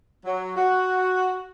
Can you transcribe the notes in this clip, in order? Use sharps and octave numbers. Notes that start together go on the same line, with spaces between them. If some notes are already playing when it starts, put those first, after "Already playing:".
F#3
F#4